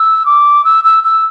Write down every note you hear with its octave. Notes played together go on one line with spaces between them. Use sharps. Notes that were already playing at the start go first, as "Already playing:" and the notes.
Already playing: E6
D6
E6
E6
E6